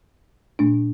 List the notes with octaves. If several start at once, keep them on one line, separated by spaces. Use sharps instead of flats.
A#2 A3 D4